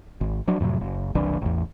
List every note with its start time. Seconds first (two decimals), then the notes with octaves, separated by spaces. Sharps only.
0.21 G#1
0.47 F3 F#3 D4
0.60 F2 A2 C3 F#3
0.81 F#1
1.15 F#1 C2 E3 D4
1.42 A1 E2